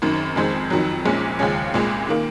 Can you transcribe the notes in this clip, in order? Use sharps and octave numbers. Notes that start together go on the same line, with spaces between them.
G#1 F#2 D#3
F2 D#3 G#3 C4
F2 D#3 F#3
A#1 A#2 G#3 C#4
D#2 C#3 F3 G#3 C#4
C2 A#2 G#3
D#3 A#3